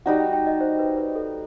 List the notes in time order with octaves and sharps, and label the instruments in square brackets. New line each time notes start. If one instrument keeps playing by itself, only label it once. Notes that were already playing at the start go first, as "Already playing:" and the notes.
[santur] G3 D#4 F#4 [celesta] F#5
[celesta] G5
G5
D#5
C5
B4
B4
A4